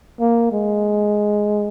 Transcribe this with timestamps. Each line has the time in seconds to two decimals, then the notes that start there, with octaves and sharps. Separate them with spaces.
0.20 A#3
0.52 G#3